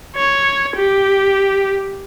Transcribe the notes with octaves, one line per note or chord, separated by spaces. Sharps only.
C#5
G4